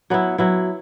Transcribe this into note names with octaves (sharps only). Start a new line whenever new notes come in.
F#3 B3 E4
F#3 B3 E4